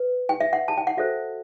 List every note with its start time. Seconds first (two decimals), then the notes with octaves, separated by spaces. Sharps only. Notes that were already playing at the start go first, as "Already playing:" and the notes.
Already playing: B4
0.29 G5
0.41 E5
0.53 F#5
0.68 A5
0.77 G5
0.87 F#5
0.97 F#4 A4 C5 E5